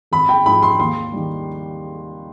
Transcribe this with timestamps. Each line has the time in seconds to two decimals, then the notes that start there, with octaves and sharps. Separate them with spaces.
0.11 G#1 B5
0.29 G5
0.46 G#2 F3 B5
0.62 C6
0.79 D#2 C6
1.12 D#3 G3